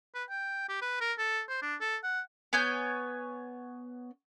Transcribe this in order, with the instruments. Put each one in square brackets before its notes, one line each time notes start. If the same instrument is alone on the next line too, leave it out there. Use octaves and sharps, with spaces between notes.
[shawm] B4
G5
G4
B4
A#4
A4
C5
D4
A4
F#5
[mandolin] B3 C#5 G#5 G6